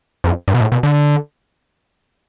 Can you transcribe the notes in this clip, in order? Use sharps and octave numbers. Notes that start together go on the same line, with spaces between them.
F2
G2
B2
A2
B2
D3